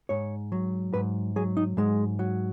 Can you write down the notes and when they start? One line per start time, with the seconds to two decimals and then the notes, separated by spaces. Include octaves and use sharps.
0.09 G#2 C#5
0.52 F#3
0.94 G#2 B4
1.36 F#3 G#4
1.57 D#4
1.77 G#2 G#3
2.19 F#3